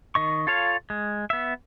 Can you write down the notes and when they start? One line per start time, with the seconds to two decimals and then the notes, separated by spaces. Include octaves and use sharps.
0.15 D#3 D#5 C#6
0.47 F4 A4 C#5 F5
0.90 G#3
1.30 B3 E5